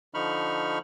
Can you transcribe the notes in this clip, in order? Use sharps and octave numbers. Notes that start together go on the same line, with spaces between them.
D3 F3 D#4 B5 C#6 F6